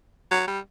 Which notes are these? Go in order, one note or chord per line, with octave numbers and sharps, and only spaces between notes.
F#3
G3